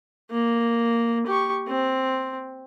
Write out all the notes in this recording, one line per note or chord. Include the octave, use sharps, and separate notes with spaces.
A#3
G4 C#6
C4